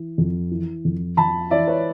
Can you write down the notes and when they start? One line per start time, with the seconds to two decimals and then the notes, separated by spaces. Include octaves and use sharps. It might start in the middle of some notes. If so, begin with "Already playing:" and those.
Already playing: E3
0.18 F2
0.51 E3
0.85 F2
1.17 F2 A5 B5
1.50 E3 D5 E5
1.67 B4 C#5